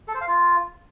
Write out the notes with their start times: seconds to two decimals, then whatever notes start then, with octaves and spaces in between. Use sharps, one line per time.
0.08 A4
0.15 C5
0.21 F5
0.28 F4